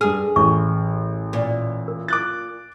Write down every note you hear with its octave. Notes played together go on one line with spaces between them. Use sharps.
G2 G#4 F6
A1 C#6
A#2
A#4
D6 F#6 A6